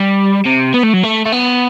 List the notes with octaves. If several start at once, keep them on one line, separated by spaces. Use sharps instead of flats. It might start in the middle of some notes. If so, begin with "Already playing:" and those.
Already playing: G3
C3
B3
A3
F#3
A3
A3
B3